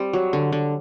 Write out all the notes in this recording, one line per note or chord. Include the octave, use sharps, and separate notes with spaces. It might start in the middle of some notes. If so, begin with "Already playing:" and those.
Already playing: G3 C4
F#3
D3
D3